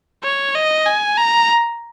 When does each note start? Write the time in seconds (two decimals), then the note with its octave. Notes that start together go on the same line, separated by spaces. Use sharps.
0.24 C#5
0.55 D#5
0.86 G#5
1.17 A#5